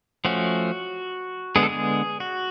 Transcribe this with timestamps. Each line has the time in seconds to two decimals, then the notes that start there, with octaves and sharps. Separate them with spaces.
0.25 F3 A3 C#4 F#4
1.56 D3 G#3 B3 G#4
1.63 A4
1.69 G#4
2.20 F#4